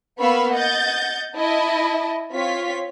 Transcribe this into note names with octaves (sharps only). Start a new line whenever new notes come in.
A#3 B3 F5 B5 C#6 E6
D#5 F#5 G6 A6
E4 D#5 A5
C4 F4 C#5 B6